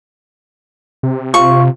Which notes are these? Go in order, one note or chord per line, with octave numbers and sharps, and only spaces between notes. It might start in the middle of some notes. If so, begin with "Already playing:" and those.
C3
F4 C#6